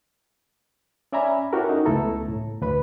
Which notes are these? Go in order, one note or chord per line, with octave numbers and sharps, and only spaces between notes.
C#4 D5 E5 G#5 A#5 B5
C#4 E4 F#4 G4 A4 A#4
D#4
C#2 A3 B3 E4 A4 A#5
A2
D2 B4 B5